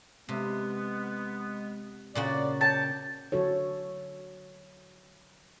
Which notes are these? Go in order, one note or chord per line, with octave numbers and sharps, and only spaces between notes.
C3 G#3 B3
A#2 C#3 F#4 D5
C#5 G5 A5
D3 F#3 F#4 A4 C#5